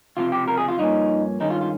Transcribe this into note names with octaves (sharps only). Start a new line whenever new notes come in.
C#2 C3 F3 F4
G4
A#4
G#4
F4
G2 F3 A#3 C#4 D#4
G2 D#3 G#3 C#4 D#4
F4
F4